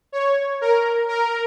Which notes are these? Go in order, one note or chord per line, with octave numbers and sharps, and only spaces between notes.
C#5
A#4
A#4